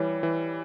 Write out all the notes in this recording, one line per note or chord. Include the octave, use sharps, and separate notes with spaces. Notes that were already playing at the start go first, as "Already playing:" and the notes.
Already playing: E3 G3 C#5
E3